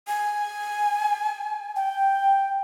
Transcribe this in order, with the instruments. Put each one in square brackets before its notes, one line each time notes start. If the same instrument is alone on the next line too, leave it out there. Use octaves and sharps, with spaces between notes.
[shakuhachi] G#5
[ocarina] G5